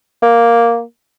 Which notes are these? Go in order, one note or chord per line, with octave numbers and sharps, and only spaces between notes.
A#3